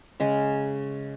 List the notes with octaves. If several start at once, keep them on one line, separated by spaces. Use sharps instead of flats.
C#3 G#3 C#4